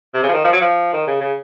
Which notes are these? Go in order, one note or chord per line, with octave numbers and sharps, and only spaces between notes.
C3
C#3
F3
D#3
F3
F#3
F3
D#3
C#3
C#3